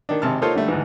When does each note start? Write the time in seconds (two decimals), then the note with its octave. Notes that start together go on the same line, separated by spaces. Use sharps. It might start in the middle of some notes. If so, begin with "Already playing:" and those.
0.09 D#3 D4
0.22 G#1 C3 A5 F6
0.42 A#3 D#4 F4 A4 C5 C#5
0.55 D3 G3 A3
0.68 D2 G#2 E3